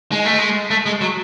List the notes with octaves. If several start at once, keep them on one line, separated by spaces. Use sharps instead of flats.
G#3
A3
G#3
A3
G#3
F#3